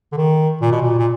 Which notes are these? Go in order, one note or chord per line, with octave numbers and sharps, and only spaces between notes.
D3
D#3
A#2
B2
A#2
A#2